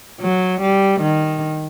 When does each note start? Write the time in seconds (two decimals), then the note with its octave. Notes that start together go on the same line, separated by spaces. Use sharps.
0.21 F#3
0.61 G3
1.01 D#3